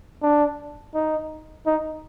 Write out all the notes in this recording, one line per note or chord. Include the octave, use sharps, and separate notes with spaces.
D4
D#4
D#4